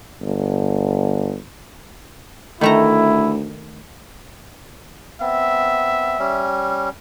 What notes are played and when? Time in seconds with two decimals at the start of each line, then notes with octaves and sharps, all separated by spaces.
0.22 G1
2.61 D2 D#3 A3 E4 A#5
5.21 B3 C4 E5
6.19 G3 C#4